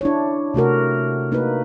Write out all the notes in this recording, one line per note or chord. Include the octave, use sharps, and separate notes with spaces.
D4 E4 C#5
C3 A3 F#4 A#4
A#3 D#4 F#4 B4